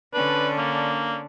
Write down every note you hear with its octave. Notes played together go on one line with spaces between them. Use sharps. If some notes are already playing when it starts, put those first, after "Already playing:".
D3 C#4 D4 B4
A#3